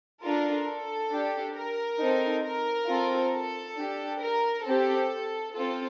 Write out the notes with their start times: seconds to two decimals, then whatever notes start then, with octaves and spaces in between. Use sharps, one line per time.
0.21 D4 F4 A4 A#4
0.66 A4
1.10 D4 G4
1.55 A#4
1.99 C4 D#4 A4
2.44 A#4
2.88 C4 F4 A4
3.32 A4
3.77 D4 G4
4.21 A#4
4.65 C4 G4 A4
5.54 C4 F4 A4